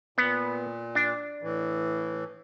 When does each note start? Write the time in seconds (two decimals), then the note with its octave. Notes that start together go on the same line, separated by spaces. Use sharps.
0.18 A#2 B3
0.95 D4
1.42 A2 E3